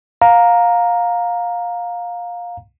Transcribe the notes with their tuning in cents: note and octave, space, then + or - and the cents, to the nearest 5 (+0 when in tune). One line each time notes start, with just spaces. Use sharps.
F5 +15 A#5 +0